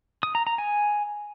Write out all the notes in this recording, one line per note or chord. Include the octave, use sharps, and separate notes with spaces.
D#6
A#5
A#5
G#5